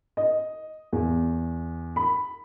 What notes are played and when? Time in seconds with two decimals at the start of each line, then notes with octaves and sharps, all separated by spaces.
0.17 D#5
0.93 E2
1.96 B5